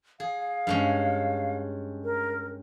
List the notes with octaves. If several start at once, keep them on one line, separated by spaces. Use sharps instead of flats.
G#4 F5
G2 G#3 C#4
A#4